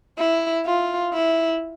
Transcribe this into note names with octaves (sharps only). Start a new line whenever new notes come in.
E4
F4
E4